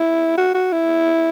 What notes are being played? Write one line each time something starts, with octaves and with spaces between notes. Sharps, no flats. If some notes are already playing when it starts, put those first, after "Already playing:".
Already playing: E4
F#4
F#4
E4